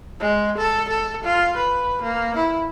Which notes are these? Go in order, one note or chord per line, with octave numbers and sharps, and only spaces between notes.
G#3
A4
A4
F4
B4
A#3
E4